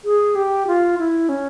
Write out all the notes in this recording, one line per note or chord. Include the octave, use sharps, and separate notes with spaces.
G#4
G4
F4
E4
C#4